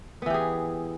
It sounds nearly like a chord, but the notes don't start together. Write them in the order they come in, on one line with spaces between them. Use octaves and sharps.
B3 E3 G4 G#4